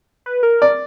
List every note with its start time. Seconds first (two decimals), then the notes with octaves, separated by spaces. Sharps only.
0.26 B4
0.43 A#4
0.62 D5